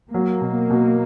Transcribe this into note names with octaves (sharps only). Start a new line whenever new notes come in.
F#3 A#3
B2
B2